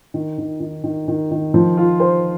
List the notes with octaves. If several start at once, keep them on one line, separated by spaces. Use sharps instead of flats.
D#3
D#3
D#3
D#3
D#3
D#3
F3
F4
C5